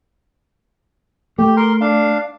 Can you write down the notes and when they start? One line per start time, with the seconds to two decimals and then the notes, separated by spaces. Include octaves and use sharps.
1.38 A3 G4
1.57 A#4 C6
1.81 D4 F5